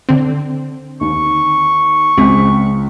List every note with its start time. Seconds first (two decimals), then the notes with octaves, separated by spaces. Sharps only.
0.09 D3 C4
1.01 D#2 C#6
2.18 C#2 G#3 C4 B6